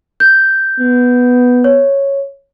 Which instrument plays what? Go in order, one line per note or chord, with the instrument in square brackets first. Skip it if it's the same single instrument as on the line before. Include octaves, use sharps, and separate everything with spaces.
[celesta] G6
[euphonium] B3
[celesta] C#5